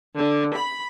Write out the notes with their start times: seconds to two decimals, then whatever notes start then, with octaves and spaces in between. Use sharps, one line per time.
0.17 D3
0.54 B5